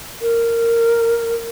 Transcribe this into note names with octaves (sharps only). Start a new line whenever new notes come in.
A#4